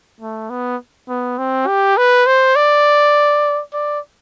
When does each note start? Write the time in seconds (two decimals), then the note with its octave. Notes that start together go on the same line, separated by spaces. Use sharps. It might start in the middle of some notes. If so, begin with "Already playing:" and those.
0.21 A3
0.50 B3
1.09 B3
1.38 C4
1.67 G4
1.97 B4
2.26 C5
2.56 D5
3.73 D5